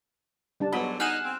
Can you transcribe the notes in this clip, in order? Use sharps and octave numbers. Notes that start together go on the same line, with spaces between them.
G3 D4 A5
G#2 D3 F#3 B3 F#4 D#5 B5
D#4 G#4 F#5 G#5 F6 F#6 E7
C4